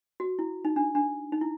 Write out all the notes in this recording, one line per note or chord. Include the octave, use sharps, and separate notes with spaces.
F#4
E4
D#4
D4
D4
D#4
E4